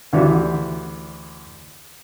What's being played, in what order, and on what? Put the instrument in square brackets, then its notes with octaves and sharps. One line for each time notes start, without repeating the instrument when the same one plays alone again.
[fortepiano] D2 E3 F#4 G4 D5 E5